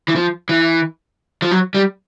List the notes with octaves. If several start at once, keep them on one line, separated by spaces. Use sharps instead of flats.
E3
F3
E3
F3
F#3
G3